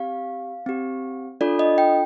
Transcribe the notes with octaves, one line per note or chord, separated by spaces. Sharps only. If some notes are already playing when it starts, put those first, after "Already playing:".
Already playing: C4 G4 F5
C4 G4
D4 F4 A4 D5
D#5
G5